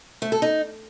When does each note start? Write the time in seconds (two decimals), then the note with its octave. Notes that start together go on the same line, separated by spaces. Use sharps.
0.22 A3
0.32 A4
0.42 D#4